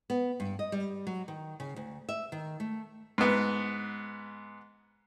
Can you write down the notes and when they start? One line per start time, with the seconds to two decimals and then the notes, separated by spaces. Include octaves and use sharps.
0.10 B3
0.40 G2
0.59 D#5
0.72 G3
1.07 F#3
1.28 D#3
1.60 C#3
1.76 D2
2.09 E5
2.32 D#3
2.60 A3
3.18 G#2 B3